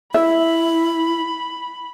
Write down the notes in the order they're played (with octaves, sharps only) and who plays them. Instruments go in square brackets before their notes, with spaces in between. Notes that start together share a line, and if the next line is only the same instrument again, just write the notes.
[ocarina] E4 [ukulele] E5 [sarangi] B5